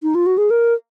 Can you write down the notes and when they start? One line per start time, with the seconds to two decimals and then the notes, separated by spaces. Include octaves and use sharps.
0.03 D#4
0.15 F4
0.26 F#4
0.38 G#4
0.50 A#4